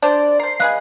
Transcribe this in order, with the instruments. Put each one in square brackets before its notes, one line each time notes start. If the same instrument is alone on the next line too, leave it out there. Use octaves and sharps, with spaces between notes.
[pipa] D4 F4 C5 [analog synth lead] D5
[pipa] A#4 C5 [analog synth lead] C7
[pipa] G#4 B4 D#5 [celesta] F5 F#6